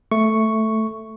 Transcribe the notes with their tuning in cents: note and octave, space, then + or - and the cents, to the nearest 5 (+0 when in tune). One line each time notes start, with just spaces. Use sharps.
A3 +0 C#6 +0